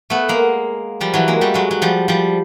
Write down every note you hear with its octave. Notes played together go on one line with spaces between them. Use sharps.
A3 B3
G#3 A#3
F3 G3
E3 F#3
G#3 A#3
G3 A3
F#3 G#3
F#3
F3 G3
F3 G3